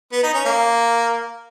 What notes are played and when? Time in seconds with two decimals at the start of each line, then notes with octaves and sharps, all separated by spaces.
0.12 B3
0.23 D#4
0.34 C#4
0.45 A#3